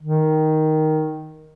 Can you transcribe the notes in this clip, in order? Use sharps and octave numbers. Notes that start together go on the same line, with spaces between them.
D#3